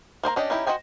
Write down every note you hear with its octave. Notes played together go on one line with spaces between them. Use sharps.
A#3 C5 D#5 A#5
C#4 D4 G4 D#5
C#4 D#4 E4 G4
F#4 C5 D#5 G5 G#5